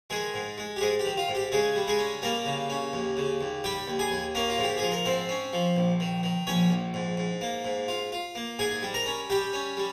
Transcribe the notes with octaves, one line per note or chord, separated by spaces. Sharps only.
D#3 G#3 G#4
G#2
G#3
G4
G#2 G#3 G#4
G4
D#3
F4
G#2
G4
C#3 G#3 G#4
G3
G#3 G#4
C#4
G3 A#3 A#4
C#3
C#4
D#2
C#3
D#2
G3 G4 G5
D#2
G#4 G#5
D#2
A#3 C#4 A#4
F4
G#2
G4
F3 G#4
A#4
G#2 C4 C5
C#4
F3
A#1
D#3
D#3
A#1 C#4 C#5
A#1
G#2
G#2
A#3
G#2
F4
F4
A#3
G#2 G#4 G#5
G3
A#4 A#5
C#4
G3 G4 G5
C#4
G3